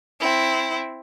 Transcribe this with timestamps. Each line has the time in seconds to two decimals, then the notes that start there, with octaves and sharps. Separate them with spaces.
0.20 C4 E4